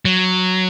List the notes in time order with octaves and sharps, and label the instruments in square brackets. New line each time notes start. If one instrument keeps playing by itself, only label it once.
[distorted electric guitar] F#3